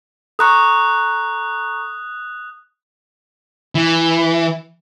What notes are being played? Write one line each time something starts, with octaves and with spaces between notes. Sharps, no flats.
A4 A#5 C#6 D#6 F#6
E3